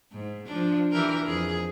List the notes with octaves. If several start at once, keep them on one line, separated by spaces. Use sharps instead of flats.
G#2
F3 D4
E3 G4 A#4
F2 G#4